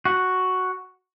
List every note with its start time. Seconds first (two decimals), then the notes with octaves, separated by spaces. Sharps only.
0.05 F#4